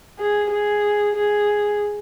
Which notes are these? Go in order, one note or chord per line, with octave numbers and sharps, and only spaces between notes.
G#4
G#4
G#4